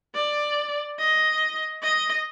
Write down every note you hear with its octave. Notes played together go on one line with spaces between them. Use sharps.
D5
D#5
D#5